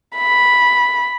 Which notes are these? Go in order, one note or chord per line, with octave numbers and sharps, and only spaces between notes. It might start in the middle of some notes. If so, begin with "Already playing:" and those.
B5